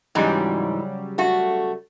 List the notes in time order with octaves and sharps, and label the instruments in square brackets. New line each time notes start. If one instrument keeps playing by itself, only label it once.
[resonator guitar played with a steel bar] G#2 E3 [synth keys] C#3 F#3 G3
[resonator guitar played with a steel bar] A3 F#4